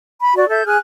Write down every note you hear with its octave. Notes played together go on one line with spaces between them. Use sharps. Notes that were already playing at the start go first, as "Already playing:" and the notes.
B5
F#4 D5
A4 E5 G6
G#4 G#5 F6 F#6